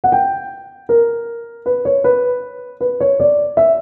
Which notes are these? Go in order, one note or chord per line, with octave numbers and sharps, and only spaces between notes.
F#5
G5
A#4
B4
C#5
B4
B4
C#5
D5
E5